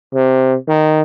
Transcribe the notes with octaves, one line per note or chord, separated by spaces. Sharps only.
C3
D#3